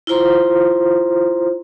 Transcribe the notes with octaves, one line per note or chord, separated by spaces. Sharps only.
E4 F4 C5 A#5 C6